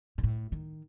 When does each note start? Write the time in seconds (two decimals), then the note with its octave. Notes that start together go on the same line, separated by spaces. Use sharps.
0.18 A#2
0.24 A2
0.52 D#3